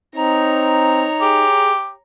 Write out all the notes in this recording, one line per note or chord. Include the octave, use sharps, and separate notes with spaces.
C4 D#4 C#5 A#5
G4 G#4